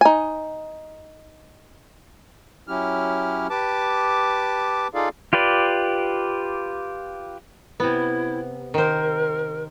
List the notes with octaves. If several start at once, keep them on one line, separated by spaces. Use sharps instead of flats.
D#4 G#5
F#3 C#4 E4 G4 F6
G4 B4 A5 D6
D#4 F4 G#4 A4 D5 F5
F4 G4 B4 D5
C3 B3 E4
D#3 A#4 C5